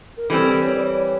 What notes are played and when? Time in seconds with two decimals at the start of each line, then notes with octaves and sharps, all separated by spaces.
0.17 A#4
0.29 E3 G3 C4 A4
0.63 C#5
0.73 D5
0.84 C#5